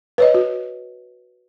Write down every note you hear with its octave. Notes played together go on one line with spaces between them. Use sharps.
B4 C#5 D#5
F#4